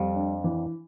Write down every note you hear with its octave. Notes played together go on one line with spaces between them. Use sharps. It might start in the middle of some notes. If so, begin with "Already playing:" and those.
Already playing: F2 G3
D4
E3